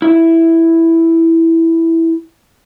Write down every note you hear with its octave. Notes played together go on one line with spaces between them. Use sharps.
E4 E5